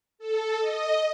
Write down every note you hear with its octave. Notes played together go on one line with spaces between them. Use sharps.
A4
D#5